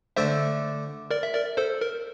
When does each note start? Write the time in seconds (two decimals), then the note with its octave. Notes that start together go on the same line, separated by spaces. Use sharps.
0.16 D3 A3 D4 C5 E5
1.11 A#4 D5
1.23 E5
1.34 A#4 D5
1.57 A4 C5
1.81 A#4